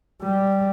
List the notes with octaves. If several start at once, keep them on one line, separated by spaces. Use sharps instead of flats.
G3